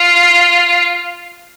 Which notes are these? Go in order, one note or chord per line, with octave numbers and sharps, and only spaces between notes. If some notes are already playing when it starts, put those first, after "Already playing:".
Already playing: F4